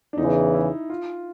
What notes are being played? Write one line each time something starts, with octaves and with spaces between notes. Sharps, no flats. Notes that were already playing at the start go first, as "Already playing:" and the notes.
D4
E2 C#3 E3 D#4
E4
F4